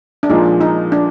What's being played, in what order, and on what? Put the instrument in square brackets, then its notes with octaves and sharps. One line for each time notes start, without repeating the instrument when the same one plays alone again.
[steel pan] D4
[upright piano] A#2 F3 G#3 [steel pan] D#4
[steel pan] D#4
D4